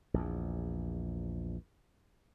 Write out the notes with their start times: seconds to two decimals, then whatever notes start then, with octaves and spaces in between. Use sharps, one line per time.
0.14 A#1 E2